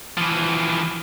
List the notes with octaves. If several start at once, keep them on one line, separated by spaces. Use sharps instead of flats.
E3 F3